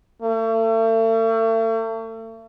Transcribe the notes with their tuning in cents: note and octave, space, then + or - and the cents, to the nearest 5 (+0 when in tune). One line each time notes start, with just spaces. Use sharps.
A3 +40